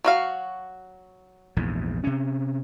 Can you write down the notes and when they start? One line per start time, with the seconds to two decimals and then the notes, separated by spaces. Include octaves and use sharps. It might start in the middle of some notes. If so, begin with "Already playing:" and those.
0.04 F#3 F#4 F5
1.57 A#1 E2 G#2
2.04 C3 C#4